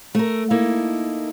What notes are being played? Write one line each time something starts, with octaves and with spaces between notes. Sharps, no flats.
A3 A#4
A#3 D#4 E4 A4